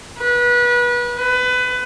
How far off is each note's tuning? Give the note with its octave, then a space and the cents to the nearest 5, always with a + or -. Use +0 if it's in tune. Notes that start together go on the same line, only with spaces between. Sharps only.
B4 -30
B4 +25